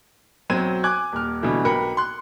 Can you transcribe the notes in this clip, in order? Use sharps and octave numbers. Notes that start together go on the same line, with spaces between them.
B1 F#3 C4 C5 G#6 D#7
G#5 D6 F#6 G#6
D#1 F6
B2 D3 E3 G3 A3
B1 A#4 B4 G5 B5 C#7
C6 F#6